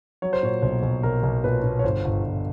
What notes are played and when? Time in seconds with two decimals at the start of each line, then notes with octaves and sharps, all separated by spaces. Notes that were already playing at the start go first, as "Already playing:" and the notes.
0.22 F#3 C#5
0.33 C5
0.43 A#2 C#5
0.62 B1 C5
0.83 B1
1.03 B1 A#4
1.23 B1
1.44 A#2 B4
1.64 A#2
1.79 C#5
1.84 G1 C5
2.05 G1
2.24 G1